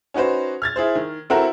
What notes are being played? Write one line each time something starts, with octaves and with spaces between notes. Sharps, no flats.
C#4 D#4 F#4 B4 C5
F6 G#6 A6
E4 G#4 C5
D#3
C4 E4 F#4 A4 A#4 F#5